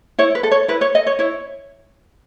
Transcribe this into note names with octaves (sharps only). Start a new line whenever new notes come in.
E4 C#5
B4
A4
C#5
E4 B4
C#5
A4 D#5
C#5
E4 C#5